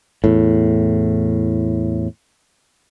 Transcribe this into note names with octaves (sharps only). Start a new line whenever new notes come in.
E2 A2